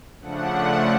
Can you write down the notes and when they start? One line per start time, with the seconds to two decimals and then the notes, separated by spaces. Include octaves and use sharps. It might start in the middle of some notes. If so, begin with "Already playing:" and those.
0.21 C#3 F3 A3 D4 F#5